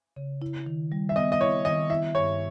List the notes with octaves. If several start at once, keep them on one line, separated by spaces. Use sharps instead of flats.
C#3
E4
D#3
G3
E5
B3 D#5
D#5
E4 C#5
D#3 D#5
E4 E5
G2 C#5